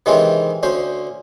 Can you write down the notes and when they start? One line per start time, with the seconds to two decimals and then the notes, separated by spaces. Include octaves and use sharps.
0.06 C3 D#3 E3 G#3 C4 C#4
0.63 D2 C#4 C5